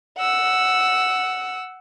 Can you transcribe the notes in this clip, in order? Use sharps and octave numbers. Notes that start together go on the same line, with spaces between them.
F#5 E6